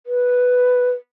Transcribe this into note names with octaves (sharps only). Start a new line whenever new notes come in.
B4